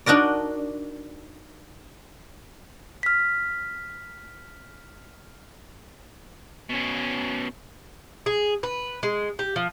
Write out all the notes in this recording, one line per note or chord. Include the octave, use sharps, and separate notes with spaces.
D4 D#4 F#4 A#4 D5
F6 B6
B2 C#4
G#4
B4
G#3
G4
F3